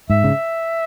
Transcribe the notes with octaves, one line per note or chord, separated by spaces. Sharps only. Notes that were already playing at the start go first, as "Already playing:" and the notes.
G#2 E5
C#3